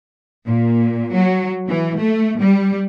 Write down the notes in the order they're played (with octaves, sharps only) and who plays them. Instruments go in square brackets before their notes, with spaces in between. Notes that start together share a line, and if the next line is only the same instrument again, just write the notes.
[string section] A#2
F#3
E3
A3
G3